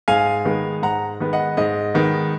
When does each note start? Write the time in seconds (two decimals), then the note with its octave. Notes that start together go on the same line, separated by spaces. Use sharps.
0.08 G#2 F5 G#5
0.45 D#3 G#3 B3
0.83 G#2 F#5 A#5
1.20 D#3 G#3 B3
1.33 D#5 F#5
1.57 G#2 D#5
1.94 D#3 G#3 B3